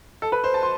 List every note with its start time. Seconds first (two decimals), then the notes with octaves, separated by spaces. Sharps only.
0.22 A4
0.32 B4
0.44 C5
0.54 A5
0.63 C6